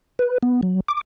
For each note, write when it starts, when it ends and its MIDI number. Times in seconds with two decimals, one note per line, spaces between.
0.19 0.38 71
0.43 0.61 59
0.63 0.80 54
0.88 1.01 86